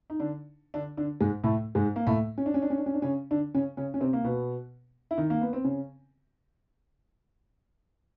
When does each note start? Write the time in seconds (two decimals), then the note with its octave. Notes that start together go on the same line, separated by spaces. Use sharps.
0.10 D#4
0.20 D3 D4
0.74 D3 D4
0.97 D3 D4
1.21 G#2 G#3
1.44 A2 A3
1.75 G#2 G#3
1.96 A#3
2.07 A2 A3
2.38 C#4
2.46 D4
2.54 C#4
2.62 D4
2.70 C#4
2.78 D4
2.86 C#4
2.94 D4
3.02 C#3 C#4
3.31 D3 D4
3.54 C#3 C#4
3.77 C#3 C#4
3.94 C#4
4.00 C3 C4
4.13 A#3
4.24 B2 B3
5.11 E4
5.18 D#3 D#4
5.30 A#3
5.41 B3
5.53 C4
5.64 C#3 C#4